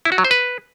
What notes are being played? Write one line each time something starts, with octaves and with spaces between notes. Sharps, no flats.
E4
F#4
F#3
C5
B4